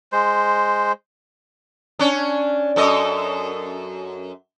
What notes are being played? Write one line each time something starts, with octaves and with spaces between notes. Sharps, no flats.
G#3 C5
C#4 D4
F#2 A4 D#5